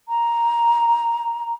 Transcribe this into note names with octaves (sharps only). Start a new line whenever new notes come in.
A#5